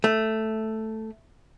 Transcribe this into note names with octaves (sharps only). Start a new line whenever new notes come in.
A3